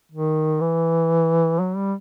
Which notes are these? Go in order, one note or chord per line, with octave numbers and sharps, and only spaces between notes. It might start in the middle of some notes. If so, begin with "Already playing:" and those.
D#3
E3
F#3
G3